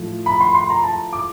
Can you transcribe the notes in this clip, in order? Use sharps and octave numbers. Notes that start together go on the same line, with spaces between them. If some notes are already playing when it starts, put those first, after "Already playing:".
Already playing: A2 F3
B5
C6
C6
A#5
A5
D6